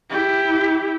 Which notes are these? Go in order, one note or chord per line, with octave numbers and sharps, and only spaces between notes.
E4 G4